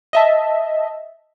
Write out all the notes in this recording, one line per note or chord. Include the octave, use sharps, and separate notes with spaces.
D#5 E5 A5